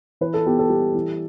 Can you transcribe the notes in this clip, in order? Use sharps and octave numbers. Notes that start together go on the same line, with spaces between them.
E3 B4
A4
B3 G4
A4
G3
E3